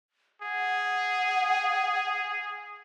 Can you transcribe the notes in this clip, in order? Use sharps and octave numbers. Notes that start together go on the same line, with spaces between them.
G#4 F#5